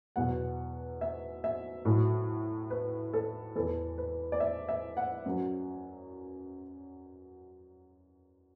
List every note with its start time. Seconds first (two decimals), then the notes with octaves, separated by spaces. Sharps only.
0.16 E2 B2 F#3 F#5
1.01 E5
1.44 E5
1.85 A2 F#3
2.70 B4
3.13 A4
3.56 E2 E3 A4
3.98 B4
4.32 D5
4.40 E5
4.68 E5
4.97 F#5
5.26 F#2 F#3